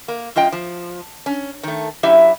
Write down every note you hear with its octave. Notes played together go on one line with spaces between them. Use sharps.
A#3
F#2 F4 D#5 G5
F3
C#4
D#3 A3
F#2 F#3 E4 G4 E5